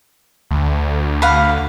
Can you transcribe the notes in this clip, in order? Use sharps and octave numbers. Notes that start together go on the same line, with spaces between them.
D2
F5 F#5 B5